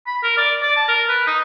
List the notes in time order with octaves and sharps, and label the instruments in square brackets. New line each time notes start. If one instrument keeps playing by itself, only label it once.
[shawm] B5
A#4
D5
D5
A5
A#4
B4
D#4